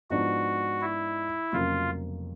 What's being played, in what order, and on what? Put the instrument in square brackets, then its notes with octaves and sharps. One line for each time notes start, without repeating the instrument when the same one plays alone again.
[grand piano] G#2 F3 G#3 B3 D4 [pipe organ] F#4
[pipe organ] E4
[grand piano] F1 F2 C#3 F#3 A#3 [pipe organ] F4